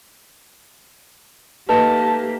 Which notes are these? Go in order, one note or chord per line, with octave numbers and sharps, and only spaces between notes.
A3 A#3 D#4 G4 A4 B4 A5